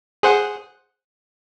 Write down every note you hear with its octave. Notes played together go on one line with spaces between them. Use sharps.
G#4 C5 F#5